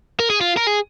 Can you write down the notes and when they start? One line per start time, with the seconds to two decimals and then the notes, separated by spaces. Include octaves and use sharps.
0.20 A#4
0.30 G#4
0.41 F4
0.57 A#4
0.67 G#4